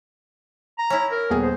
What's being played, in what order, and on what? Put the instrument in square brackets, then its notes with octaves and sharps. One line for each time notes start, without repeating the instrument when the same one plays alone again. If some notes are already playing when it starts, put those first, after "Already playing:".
[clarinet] A#5
[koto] C#4 E4
[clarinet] A#4
[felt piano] D#1 B3 G#4
[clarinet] C5